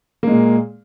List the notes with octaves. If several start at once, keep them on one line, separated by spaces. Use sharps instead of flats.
A#2 G#3 A#3